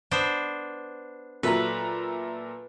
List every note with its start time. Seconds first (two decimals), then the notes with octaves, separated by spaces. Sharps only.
0.11 B3 D4 C5
1.43 A#2 F#3 A4 B4 E5 A#5